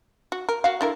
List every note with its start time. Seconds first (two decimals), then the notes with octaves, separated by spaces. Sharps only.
0.32 F#4
0.49 A#4
0.64 F#4 F5
0.81 D3 E4 A#4